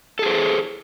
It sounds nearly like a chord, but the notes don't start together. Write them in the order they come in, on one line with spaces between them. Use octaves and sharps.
A4 G#4 C5